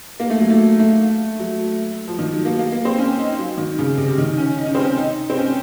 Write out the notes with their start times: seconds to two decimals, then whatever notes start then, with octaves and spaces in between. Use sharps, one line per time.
0.20 A#3
0.30 A3
0.40 F#3
0.50 A3
0.80 A3
1.39 F#3
2.08 F3
2.19 D#3
2.33 F#3
2.45 A#3
2.59 A#3
2.72 A#3
2.85 C4
2.98 C#4
3.19 D#4
3.39 F#3
3.58 D#3
3.78 C#3
3.98 C3
4.18 D#3
4.38 C#4
4.58 D#4
4.66 C#4
4.75 C4
4.83 C#4
4.98 D#4
5.30 C4
5.38 C#4